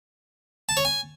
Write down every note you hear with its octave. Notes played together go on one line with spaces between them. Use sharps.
A5
C#5
G#5